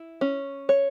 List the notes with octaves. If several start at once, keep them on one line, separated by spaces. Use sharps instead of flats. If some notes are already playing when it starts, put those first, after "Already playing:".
Already playing: E4
C#4
C#5